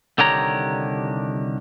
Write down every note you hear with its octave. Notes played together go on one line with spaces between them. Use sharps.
C2 D3 D#3 G4 C#5 A#5